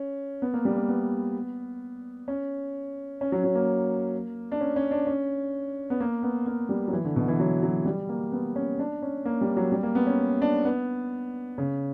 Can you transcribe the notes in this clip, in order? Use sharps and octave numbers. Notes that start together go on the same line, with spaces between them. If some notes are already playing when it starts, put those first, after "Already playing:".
Already playing: C#4
B3
A#3
G3
A#3
B3
C#4
C#4
F#3
F#3
A#3
D4
C#4
C#4
D4
C#4
B3
A#3
B3
A#3
G3
F#3
E3
D3
B2
E3
F#3
F#3
G3
A#3
B3
C#4
D4
C#4
A#3
G3
F#3
G3
A#3
B3
C#4
D4
B3
C#3